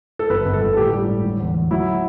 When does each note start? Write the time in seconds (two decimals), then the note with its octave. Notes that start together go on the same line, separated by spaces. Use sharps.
0.19 A4
0.30 G1 B4
0.45 G1
0.53 A4
0.61 G1
0.73 A4
0.77 A2 G4
0.93 G3
1.09 A2
1.24 D3
1.40 E2
1.55 E2
1.71 F#3 E4